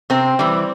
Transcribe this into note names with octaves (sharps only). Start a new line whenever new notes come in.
C3 C4
E3 G3